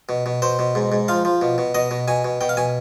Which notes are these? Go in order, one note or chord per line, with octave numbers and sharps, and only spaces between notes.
B2
B2
B2 C5
B2
G#2
G#2
F3 F5
F3
B2
B2
B2 D#5
B2
B2 G#5
B2
B2 G5
F5
B2 G#5